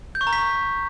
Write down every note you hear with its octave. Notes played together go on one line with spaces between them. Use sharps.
G6
C#6
A#5
B6
C#6